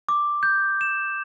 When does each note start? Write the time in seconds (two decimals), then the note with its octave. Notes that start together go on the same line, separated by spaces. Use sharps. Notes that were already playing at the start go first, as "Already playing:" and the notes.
0.09 D6
0.43 G6
0.81 E7